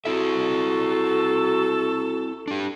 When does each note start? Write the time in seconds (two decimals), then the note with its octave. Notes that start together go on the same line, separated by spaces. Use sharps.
0.05 C4 E4 F#4 A4 E5
2.48 D4 G4